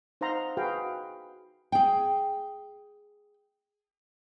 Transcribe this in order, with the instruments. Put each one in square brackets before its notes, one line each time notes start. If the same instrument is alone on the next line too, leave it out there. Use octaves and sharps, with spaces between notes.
[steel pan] D#4 C5 F5 F#5 A#5 C6
F#4 G#4 B4 F5 G5
[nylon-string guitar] G#4 G5